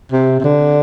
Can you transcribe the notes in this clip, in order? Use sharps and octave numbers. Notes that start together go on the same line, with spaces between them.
C3
C3
D3